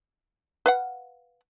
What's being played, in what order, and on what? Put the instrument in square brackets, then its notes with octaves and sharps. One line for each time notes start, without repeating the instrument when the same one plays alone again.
[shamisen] B4 F5 F#5